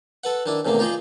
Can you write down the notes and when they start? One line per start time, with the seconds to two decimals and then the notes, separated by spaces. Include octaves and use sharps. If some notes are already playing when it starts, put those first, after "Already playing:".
0.24 A4 B4 F#5
0.46 D#3 D4 E4
0.65 E2 A2 C3 D#3 A#3
0.79 D#4 F4 G4 G#4 D#5